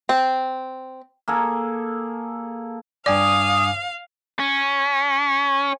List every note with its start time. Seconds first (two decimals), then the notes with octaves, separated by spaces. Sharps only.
0.09 C4
1.28 A#3 G#4 A4
3.06 G2 D5 F5 G#5 D6 D#6
4.39 C#4